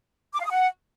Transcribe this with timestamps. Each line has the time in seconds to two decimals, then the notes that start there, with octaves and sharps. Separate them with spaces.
0.35 D6
0.40 F5
0.45 D#6
0.50 F#5